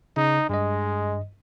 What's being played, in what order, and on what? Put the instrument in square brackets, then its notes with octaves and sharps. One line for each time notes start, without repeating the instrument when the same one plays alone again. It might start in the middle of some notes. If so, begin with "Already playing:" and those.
[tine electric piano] C#3 [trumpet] D#4
[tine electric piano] G2 D#5 [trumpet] G#3